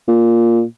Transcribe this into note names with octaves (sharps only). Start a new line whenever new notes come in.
A#2